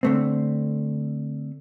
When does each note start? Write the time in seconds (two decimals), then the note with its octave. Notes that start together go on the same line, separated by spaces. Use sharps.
0.03 D3 A3 C4